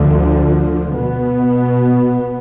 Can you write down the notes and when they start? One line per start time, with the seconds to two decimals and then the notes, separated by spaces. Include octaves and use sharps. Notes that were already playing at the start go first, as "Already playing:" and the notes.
Already playing: D2 D3 F3
0.96 B2 B3